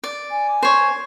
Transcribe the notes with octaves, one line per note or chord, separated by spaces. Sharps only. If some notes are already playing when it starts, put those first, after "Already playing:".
D5
G#5
C5 C#5